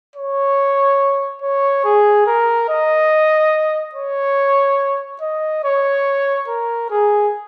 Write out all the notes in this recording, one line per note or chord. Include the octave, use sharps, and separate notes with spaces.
C#5
C#5
G#4
A#4
D#5
C#5
D#5
C#5
A#4
G#4